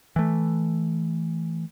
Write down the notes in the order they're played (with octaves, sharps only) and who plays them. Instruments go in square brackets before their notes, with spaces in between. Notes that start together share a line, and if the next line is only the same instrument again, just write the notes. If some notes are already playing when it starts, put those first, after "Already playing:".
[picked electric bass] E3 A3